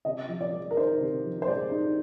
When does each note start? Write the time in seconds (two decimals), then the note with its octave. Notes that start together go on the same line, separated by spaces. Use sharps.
0.05 C3 D#5
0.28 F3
0.41 D5
0.52 G#3
0.71 A#4
0.77 D#4 C5
1.01 C3
1.25 F3
1.42 C5
1.47 G#3 D5
1.71 D#4